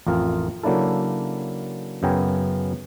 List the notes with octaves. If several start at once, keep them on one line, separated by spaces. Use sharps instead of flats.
A1 F2 F4 A#4 F5
C#3 F#3 A#3 D4 E4 A4
F#2 C#3 B3 G5 G#5 A#5